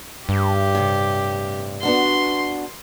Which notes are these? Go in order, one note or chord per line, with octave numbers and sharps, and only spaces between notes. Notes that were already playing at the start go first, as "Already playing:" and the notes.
G2 G4
A2 C3
B3 D4 F#4 C6